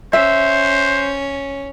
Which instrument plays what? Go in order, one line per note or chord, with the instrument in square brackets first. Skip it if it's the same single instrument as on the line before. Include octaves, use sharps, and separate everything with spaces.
[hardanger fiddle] C#4 [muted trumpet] C5 [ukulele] E5